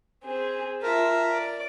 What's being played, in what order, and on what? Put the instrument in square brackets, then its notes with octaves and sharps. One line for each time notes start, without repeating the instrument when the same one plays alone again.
[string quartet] C4 G#4
[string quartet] F4 E5 A5 [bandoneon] A#4
[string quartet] D5